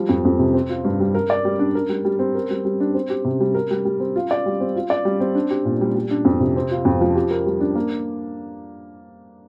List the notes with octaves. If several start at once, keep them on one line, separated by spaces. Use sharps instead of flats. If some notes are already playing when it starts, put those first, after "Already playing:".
Already playing: F3 G3
F2
F2
C3
C4
F4
G2
G3
A#4
D5
G3
D4
A#4
G3
G3
C4
A#4
G3
G3
D4
C4
G4
C3
G3
A#4
G3
G3
C4
F4
D5
G3
C4
F4
D5
G3
C4
D4
G4
A#2
G3
G3
D4
F2
C3
C4
F4
F2
F3
G4
A#4
G3
D4
A#3